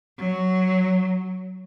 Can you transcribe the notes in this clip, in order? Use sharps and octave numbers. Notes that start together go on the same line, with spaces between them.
F#3